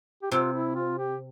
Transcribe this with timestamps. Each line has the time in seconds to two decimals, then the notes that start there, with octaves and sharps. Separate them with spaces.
0.23 G4
0.31 C3 F4
0.53 E4
0.75 F4
0.98 G4